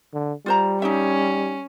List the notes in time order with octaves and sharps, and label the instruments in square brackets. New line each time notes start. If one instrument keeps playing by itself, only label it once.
[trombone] D3
[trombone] G3 [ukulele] F4 C5 A#5
[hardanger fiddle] C#4 [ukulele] D#4 G4 E5